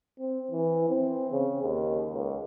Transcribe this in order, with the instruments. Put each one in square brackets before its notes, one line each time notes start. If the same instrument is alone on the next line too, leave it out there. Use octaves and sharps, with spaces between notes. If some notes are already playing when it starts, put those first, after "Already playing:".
[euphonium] C4
E3
C4
C#3
D#2
C#2